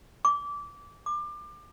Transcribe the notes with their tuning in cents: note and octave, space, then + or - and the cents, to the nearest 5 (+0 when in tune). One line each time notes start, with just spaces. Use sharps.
D6 -20
D6 +30